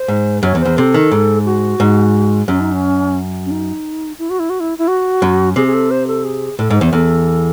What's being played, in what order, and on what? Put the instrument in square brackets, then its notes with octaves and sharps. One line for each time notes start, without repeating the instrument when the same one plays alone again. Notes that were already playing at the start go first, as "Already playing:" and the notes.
Already playing: [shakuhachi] C5
[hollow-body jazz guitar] G#2
[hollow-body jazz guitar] F#2 [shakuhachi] C#5
[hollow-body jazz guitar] E2
[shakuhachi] C5
[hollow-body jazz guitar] E2
[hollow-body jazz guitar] C3 [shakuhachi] A4
[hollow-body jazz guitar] D#3
G#2
[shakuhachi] F#4
[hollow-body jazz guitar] G#2
[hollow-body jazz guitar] F#2 [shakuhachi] C#4
[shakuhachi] D#4
C#4
C#4
D#4
E4
F#4
E4
F#4
E4
E4
F#4
[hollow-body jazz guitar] F#2
[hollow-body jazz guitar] C3 [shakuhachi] G#4
[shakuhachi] G#4
A4
C5
A4
G#4
[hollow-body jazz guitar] A2 [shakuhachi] A4
[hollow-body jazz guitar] G#2
[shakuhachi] C5
[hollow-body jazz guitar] E2
[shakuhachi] C5
[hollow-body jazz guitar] E2 [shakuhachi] A4